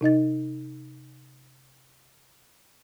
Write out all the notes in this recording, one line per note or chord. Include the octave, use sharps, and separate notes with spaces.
C3 D#4 D#5 A6